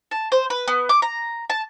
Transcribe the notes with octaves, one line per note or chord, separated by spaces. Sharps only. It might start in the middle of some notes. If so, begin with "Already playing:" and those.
A5
C5
B4
B3
D6
A#5
A5